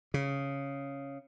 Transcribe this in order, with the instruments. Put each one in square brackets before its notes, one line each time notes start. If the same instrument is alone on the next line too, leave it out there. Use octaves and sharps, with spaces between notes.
[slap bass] C#3